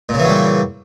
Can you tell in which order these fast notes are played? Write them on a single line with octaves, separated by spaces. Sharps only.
A#2 C#3 E3 F#3 G3